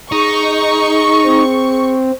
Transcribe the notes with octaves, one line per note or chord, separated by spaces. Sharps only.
D#4 G#4 C#6
C4